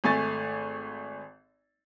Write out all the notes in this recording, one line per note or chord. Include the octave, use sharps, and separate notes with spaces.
G#1 A3 G#5 C#6 A6